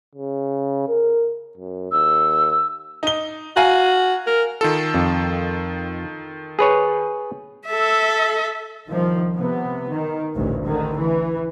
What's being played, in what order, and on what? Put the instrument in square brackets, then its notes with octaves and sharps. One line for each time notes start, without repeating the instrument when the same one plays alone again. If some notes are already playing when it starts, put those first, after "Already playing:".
[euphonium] C#3
A#4
F#2
[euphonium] D#2 [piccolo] E6
[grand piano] D#4 G7
[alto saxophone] F#4 [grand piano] F5 G#5 A#5
[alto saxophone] A#4
[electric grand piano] D#3 F4 A4
[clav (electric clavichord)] F2
G#4 B4 C#5
[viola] A4 E5
[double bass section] C2 D#3 F3
C3 B3
D#3
A1 D2 G2 A#2
D3 D#3
E3